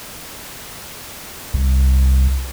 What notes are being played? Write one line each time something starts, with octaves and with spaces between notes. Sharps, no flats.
C2